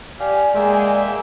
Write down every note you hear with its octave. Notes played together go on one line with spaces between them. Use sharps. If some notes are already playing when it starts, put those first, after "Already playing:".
G4 D5 F5 G#5
G#3 A#3 E5 G5